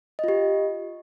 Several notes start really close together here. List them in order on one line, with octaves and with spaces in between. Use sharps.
D#5 F4 G4